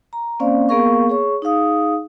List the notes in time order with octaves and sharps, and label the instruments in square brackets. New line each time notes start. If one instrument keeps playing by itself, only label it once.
[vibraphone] A#5
A#3 C4 C#4 C5 D5 F5
A#3 B3 G#4 A#4 F5 C#6
G#4 C#5 C#6
D#4 G#4 F5 D#6